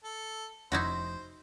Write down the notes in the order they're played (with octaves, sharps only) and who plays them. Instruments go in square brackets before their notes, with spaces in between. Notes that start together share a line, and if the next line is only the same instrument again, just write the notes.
[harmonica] A4
[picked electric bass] F1 F2 [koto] D#4 E4 F#4 [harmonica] C5